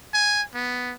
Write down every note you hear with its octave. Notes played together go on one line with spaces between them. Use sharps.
G#5
B3